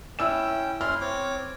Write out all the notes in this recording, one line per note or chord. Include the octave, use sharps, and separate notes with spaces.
C#4 E4 G5 E6 E7
C#4 E4 C6 F6
C4 C#5 D6